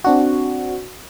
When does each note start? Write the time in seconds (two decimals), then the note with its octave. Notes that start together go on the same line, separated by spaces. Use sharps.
0.04 C4 D4 F#4